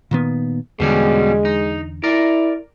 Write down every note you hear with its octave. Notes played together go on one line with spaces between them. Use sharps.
A#2 D#3 B3
E2 B2 D3 G3 G#3 C#4
D#4
E4 A#4 D5